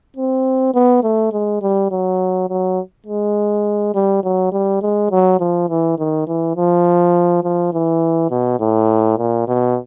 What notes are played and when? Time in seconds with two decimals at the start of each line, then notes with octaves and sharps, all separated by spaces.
0.16 C4
0.74 B3
1.03 A3
1.32 G#3
1.62 G3
1.91 F#3
2.49 F#3
3.07 G#3
3.95 G3
4.23 F#3
4.52 G3
4.81 G#3
5.11 F#3
5.40 F3
5.69 E3
5.99 D#3
6.27 E3
6.56 F3
7.44 F3
7.73 E3
8.30 B2
8.60 A2
9.18 A#2
9.48 B2